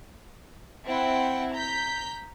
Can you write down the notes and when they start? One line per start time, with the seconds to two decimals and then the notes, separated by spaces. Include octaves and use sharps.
0.86 C4 E4 F#5 G5
1.53 A#5 G6 B6